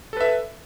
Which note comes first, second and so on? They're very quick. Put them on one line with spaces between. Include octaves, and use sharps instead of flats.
A4 B4 E5